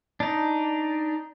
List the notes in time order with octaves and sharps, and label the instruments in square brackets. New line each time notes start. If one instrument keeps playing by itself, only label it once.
[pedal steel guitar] D4 D#4